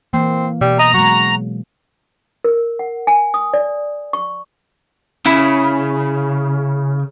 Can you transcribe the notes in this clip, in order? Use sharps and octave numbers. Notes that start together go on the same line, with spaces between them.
E3 A#3 C4
B2 G3
D#5 A#5
F#3 G#3 F#4
A#4
F#5
G#5
D#6
D5
C#6
C#3 E4